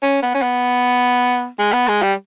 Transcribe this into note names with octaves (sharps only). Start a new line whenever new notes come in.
C#4
B3
C#4
B3
G#3
B3
G#3
G3